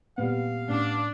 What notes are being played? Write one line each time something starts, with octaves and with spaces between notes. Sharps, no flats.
A#2 G3 B3 C4 F5
A2 C#4 D4